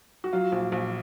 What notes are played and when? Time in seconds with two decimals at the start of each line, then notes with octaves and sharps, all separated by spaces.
0.24 F#4
0.33 F#3 F4
0.52 A#1
0.72 A#1